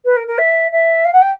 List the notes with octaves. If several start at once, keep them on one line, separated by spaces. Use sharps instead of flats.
B4
A#4
A#4
E5
E5
F5
F#5
G5